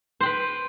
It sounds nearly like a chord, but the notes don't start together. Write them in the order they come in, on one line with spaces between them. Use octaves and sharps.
C5 G5 B4